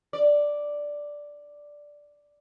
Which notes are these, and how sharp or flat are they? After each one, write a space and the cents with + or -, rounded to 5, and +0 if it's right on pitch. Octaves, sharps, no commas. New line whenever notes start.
D5 +0